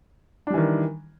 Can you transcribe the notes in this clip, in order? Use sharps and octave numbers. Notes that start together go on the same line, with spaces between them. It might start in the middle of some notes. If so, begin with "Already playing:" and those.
D#3 E3 G3 D4